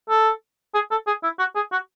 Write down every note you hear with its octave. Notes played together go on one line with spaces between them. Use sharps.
A4
G#4
A4
G#4
E4
F#4
G#4
F#4